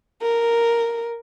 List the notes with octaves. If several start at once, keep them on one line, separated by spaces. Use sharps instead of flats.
A#4